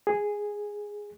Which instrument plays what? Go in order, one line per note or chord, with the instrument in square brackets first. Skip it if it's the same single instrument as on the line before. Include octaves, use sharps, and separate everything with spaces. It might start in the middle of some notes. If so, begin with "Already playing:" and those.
[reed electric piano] G#4